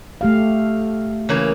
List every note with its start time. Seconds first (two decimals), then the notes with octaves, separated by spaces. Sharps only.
0.21 A3 G4 F5
1.29 C#3 E3 A#3